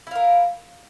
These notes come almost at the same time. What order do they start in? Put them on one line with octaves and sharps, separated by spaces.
E4 F5 A#4